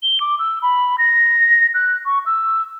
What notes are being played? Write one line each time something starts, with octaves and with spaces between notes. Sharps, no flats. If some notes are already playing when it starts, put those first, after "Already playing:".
G7
D6
E6
B5
A#6
F#6
C#6
E6